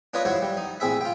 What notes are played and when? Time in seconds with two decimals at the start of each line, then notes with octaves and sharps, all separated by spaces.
0.14 D4 F4 B4 C#5 D#5
0.25 G2 F3 E4 C5 C#5 F#5
0.42 G3
0.57 D#4
0.80 A1 C4 G#4 E5 B5
1.01 F4 G5